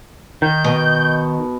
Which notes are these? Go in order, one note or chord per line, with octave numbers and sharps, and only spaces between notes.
D#3 G6
B2